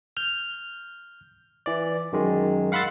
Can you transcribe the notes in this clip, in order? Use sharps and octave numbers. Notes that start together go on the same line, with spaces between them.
F6 G6
E3 D5
F#2 D#3 G#3
F5 F#5 B5 C6 E6 A6